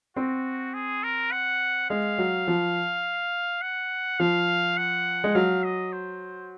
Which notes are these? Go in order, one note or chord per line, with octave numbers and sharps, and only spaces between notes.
C4 F#4
G#4
A#4
F#5
G#3 F5
F#3
F3
F#5
F3 F5
F#5
G#3
F#3 F5
D#5
C5